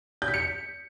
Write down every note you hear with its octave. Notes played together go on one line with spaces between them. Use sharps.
G6
B6
C#7